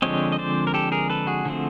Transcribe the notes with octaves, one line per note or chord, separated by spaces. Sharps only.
D3 F3 G#3 C4 C#5 D#5
D#5
C5 D5
A#4
G4 A4
G#4 A#4
A4 B4
F#4 G#4
D3 F3 A3 C4